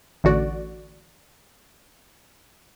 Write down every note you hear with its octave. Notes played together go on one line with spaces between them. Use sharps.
A1 D3 F#4 D5